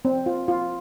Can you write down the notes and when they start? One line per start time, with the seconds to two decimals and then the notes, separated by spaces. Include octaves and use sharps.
0.05 C4
0.26 F4
0.48 F4